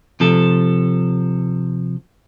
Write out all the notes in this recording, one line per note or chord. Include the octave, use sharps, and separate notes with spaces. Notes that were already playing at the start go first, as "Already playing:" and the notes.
C3 F3 A4